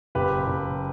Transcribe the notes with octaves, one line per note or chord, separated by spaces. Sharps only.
F#1 G4 B4
F#1